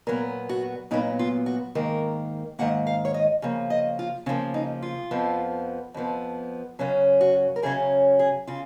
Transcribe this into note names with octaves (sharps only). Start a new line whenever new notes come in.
A#2 F#3 B3 A#4
F#4
A#2 F#3 B3 D#4
F4
F#4
G#2 D#3 A#3 A#4
G#2 D#3 A#3 F#5
F5
C#5
D#5
C#3 F3 A#3
D#5
F4
C#3 F3 A#3 C#4
D#4
F4
F2 F3 B3
F2 F3 B3
F#2 C#3 F#3 C#4
F#4
A#4
F#2 C#3 F#3 C#4 G#4
G#4
C#3 F4